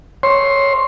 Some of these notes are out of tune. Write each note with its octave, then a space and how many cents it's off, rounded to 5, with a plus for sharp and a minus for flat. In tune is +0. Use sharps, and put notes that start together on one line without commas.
C#5 +0 C6 +10